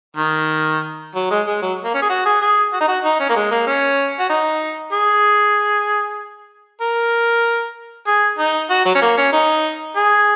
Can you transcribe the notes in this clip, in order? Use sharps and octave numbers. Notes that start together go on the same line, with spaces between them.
D#3
F#3
G#3
G#3
F#3
A#3
C#4
G#4
F#4
G#4
G#4
F#4
D#4
F#4
D#4
C#4
A#3
G#3
A#3
C#4
F#4
D#4
G#4
A#4
G#4
D#4
F#4
F#3
C#4
A#3
C#4
D#4
G#4